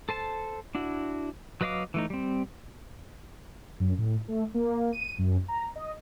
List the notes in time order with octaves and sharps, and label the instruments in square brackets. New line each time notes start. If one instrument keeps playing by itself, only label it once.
[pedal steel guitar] A4 C5 A5
D4 E4 F#4
F#3 B4 D#5 F5 D6
E3 A3 D#4
G3 C4
[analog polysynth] F#2
A2
A3
A#3
D#7
F#2
A#5
D#5